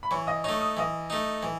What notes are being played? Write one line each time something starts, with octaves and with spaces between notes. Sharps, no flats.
B5
E3 C#5 C#6
D#5 D#6
A3 D#4 C#5 C#6
D#6
E3 D#5 D#6
A3 D#4
E3